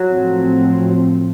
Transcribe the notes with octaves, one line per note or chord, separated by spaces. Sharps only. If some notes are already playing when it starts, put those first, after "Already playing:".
Already playing: F#3
A2 F3 A3 C4